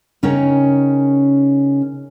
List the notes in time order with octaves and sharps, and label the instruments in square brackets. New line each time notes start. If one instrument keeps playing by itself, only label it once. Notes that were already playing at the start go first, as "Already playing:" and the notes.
[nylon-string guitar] C#3 C#4 D#4 A#4 G5